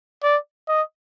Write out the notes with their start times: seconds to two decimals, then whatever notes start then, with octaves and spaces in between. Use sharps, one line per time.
0.23 D5
0.68 D#5